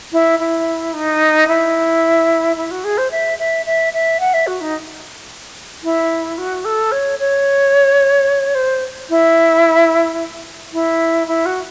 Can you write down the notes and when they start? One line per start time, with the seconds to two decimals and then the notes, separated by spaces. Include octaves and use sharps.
0.12 E4
0.39 E4
0.93 D#4
1.48 E4
2.57 E4
2.71 F#4
2.84 G#4
2.98 C5
3.11 E5
3.38 E5
3.66 E5
3.93 E5
4.20 F#5
4.34 E5
4.47 F#4
4.61 D#4
5.83 E4
6.38 F#4
6.65 A4
6.92 C#5
7.19 C#5
8.55 C5
9.10 E4
10.73 E4
11.27 E4
11.46 F#4